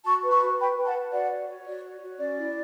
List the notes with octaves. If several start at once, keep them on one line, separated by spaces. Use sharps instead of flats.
F#4 A5 C#6
B4
A5 C#6
F#4
B4 G5 B5
B4
F#5 A5
B4
F#4 D5 F#5
C#5
C#5
F#4 D5
C#5
F#4
C#4 D5
E4